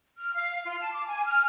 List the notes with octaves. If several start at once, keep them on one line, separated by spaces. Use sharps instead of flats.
F6
F5
F4
A5
D6
G#5
F6